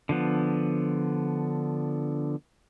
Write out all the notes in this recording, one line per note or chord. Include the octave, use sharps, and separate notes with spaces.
D3 F3 B3